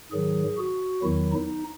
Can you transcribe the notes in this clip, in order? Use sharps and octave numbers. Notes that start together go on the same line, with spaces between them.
G#2 D#3 F#3 G#4
F#4
E2 D#3 F#3 E4
D#4